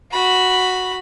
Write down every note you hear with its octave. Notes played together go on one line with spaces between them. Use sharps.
F#4 B5